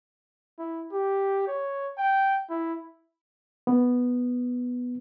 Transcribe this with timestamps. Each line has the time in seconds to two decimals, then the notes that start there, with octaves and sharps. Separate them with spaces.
0.59 E4
0.92 G4
1.47 C#5
1.97 G5
2.50 E4
3.67 B3